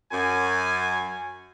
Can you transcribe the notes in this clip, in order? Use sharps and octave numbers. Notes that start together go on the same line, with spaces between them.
F#2 G#5